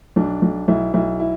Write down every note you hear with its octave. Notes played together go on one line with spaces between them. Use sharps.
B1 D4
B1
B1 E4
B1 E4
E4